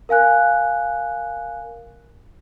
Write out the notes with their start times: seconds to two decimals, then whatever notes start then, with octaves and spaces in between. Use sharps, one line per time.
0.09 A#4 F5 G#5 F#6